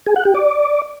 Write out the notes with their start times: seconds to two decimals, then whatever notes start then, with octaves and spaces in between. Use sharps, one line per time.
0.06 G#4
0.16 F#5
0.25 G4
0.35 D5